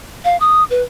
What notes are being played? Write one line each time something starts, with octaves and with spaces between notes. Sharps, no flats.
F5
D#6
B4